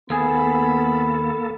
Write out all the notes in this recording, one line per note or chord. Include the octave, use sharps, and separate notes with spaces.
D#2 A#3 B3 G#4 A4 B5